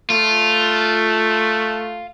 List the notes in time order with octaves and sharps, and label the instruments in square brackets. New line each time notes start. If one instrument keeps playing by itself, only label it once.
[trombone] A3 [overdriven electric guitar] F4